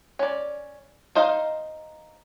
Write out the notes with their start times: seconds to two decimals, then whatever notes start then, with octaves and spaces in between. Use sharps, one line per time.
0.19 C#4 D5
1.15 D#4 C5 D#5 F5